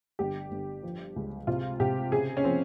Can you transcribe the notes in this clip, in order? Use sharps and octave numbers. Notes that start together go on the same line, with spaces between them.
G1 G4
G1
F3
C#2
C3 F4
C3 G4
C#3 G#4
C#4
F3 C4